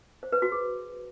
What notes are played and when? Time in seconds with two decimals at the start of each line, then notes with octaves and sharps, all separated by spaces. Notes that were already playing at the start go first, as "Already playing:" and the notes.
0.23 C5
0.32 B4
0.42 F#4
0.52 G#4